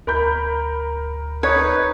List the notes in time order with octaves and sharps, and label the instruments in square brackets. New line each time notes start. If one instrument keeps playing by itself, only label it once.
[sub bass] D2 [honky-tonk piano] A#4 B5 G6
[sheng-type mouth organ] D#4 B4 [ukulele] C#5